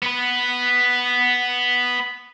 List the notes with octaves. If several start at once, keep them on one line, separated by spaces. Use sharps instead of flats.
B3 B4